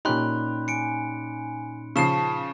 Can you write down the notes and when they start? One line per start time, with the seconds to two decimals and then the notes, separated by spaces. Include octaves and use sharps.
0.05 A#2 C#4 D#4 G4 B5 C6 F#6
0.68 G#5 C#7 D7
1.96 C#3 F3 A5 C#6 C7 E7